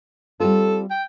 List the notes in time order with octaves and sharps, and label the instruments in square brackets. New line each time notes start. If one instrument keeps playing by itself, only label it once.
[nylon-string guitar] G3 C4 F4 [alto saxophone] A4
[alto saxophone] G5